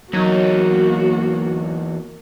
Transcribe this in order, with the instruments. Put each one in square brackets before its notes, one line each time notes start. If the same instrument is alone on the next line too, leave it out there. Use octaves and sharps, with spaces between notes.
[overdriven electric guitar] E2 D#4 [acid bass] F#3 [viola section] A#3 [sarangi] F#4